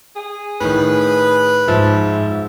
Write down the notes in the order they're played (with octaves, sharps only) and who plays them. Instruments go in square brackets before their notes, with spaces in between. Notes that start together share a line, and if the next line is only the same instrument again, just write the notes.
[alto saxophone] G#4
[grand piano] A2 D#3 [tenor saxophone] B4
[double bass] G#2 [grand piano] F3 [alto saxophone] E5